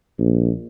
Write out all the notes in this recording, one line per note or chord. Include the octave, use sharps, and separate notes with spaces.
A#1